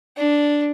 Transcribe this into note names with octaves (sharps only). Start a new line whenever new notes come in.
D4